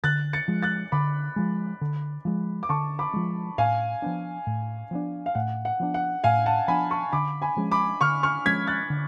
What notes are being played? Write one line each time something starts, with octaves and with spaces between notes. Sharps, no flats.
D3 F#6 A6
A6 C#7
F3 G#3
F#6 A6
D3 B5 D6
F3 G#3
D3
F3 G#3
D6
D3 A5 C#6
B5 D6
F3 G#3
A2 F5 G#5
F3 B3 D4
A2
F3 B3 D4
F5
A2 F#5
F#5
F3 B3 D4
F#5
A2 F5 G#5
F#5 A5
F3 B3 D4 G#5 B5
A5 C#6
D3 B5 D6
G#5 B5
F3 G#3 C#4
B5 D6
D3 C#6 F6
C#6 F6
F3 G#3 C#4 G#6 B6
F#6 A6
D3